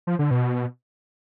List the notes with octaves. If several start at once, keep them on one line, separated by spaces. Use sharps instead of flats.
F3
D3
B2